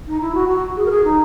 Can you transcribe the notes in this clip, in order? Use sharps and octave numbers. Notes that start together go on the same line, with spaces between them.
D#4
E4
F#4
F#4
G#4
A#4
G#4
D#4